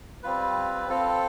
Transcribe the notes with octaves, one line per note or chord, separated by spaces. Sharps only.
G3 C4 F4 B4
C4 F4 A4